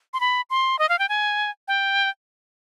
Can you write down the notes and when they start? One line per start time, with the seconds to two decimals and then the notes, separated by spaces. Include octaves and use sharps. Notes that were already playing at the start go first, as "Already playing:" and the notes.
0.14 C6
0.20 B5
0.50 C6
0.79 D#5
0.89 F5
0.99 G5
1.09 G#5
1.68 G5